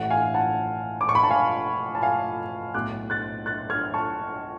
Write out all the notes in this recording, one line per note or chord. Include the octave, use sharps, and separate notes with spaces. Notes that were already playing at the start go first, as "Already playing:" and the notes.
Already playing: A1 A2 F#5
F5 G#5
F#5 A5
D6
C#6
B5
A5
F5 G#5
A5
F5 G#5
B1 A2 D6 F#6
F#6 A6
F#6 A6
F6 G#6
A5 C#6